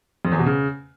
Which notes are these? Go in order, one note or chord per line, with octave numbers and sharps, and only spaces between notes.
F2
E2
B2
C#3